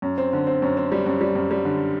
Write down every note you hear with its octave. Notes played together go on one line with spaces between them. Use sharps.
F#2
C4
D3
C4
F#2
C4
G3
F#2
G3
F#2
G3
D3